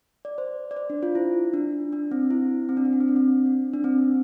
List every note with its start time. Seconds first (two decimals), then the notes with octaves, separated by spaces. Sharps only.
0.25 D5
0.38 C5
0.71 D5
0.76 C5
0.90 D4
1.03 F4
1.15 E4
1.54 D4
1.92 D4
2.11 C4
2.30 E4
2.69 C4
2.77 D4
2.85 C4
2.93 D4
3.00 C4
3.08 D4
3.16 C4
3.46 D4
3.73 D4
3.84 C4